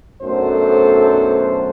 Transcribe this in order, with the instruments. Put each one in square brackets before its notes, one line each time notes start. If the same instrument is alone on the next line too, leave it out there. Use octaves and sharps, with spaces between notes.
[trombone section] B1 F#2 A3 D4 A4 C5